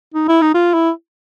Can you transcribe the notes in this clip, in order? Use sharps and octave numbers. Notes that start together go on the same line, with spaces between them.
D#4
E4
D#4
F4
E4